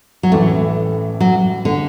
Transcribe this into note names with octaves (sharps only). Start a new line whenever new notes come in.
F#3
A1 A2 E3 A3
F#3
D3